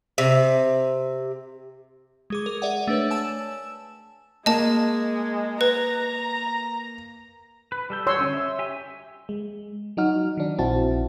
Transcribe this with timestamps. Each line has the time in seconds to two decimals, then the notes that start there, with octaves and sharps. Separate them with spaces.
0.18 C3
2.30 G#3 G#4 D6
2.46 A#4
2.62 G#4 D5 E5 F#5
2.87 A3 D4 B4 C#5
3.11 G#5 A5 E6 E7
4.46 G#3 A#3 D#5 A5
5.61 B4 A#5
7.72 B4
7.90 G3 A4 G6
8.07 C#5 C6 E6
8.18 D3 C#4
8.34 E5
8.59 G4 E5 G#5
9.29 G#3
9.97 F#3 D#4 F#4 F6
10.37 D#3 D4
10.58 A#1 C4 E4 F#4 A5